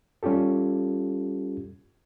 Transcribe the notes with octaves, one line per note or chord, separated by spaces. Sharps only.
G3 C#4 F4 G4 A4